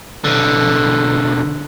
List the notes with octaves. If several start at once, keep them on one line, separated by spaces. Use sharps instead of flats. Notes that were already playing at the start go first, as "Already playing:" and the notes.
B1 D3